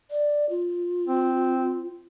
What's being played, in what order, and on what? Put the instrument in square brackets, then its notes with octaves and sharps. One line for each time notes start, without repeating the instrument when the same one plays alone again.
[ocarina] D5
F4
[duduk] C4